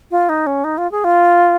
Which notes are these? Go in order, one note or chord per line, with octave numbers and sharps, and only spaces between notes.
F4
D#4
C#4
D#4
F4
G#4
F4